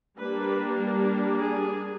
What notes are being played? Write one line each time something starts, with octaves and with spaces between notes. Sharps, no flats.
G3 A#3 D4 B4
G#4